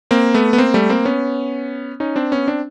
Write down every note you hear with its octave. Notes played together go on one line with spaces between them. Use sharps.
A#3 C4
A3 B3
B3
A#3 C4
G3 A3
A#3 C4
B3 C#4
C#4 D#4
C4 D4
B3 C#4
C4 D4